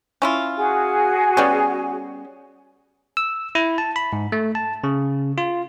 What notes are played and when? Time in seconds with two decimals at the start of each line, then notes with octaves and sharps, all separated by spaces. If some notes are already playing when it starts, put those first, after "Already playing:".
0.22 C#4 E4 F4
0.56 F#4 G#4 G#5
1.37 G3 B3 C#4
3.17 E6
3.55 E4
3.78 A5
3.96 B5
4.13 G#2
4.32 A3
4.55 A5
4.84 C#3
5.38 F4